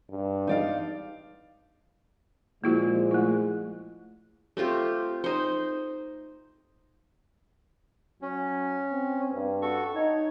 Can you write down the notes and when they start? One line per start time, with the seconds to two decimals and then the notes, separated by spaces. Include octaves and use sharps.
0.10 G2
0.47 D#4 D5 F5
2.64 A#2 F3 G#3 A#3 E4 F#4
3.11 A3 E4
4.57 A3 C4 F4 G4
5.24 D#4 C5
8.22 F#3 C#4
8.92 C4
9.33 G2
9.62 F#4 A4 C#6
9.95 D#4 C#5